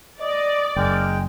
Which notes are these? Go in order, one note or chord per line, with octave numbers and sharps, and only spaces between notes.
D5 D#5
F#1 G#3 A#4 G5